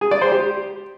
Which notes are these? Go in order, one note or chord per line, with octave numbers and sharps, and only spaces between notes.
G#4
D5
C5
G4